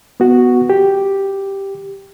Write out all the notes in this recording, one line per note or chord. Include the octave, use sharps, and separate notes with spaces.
B3 F#4
G4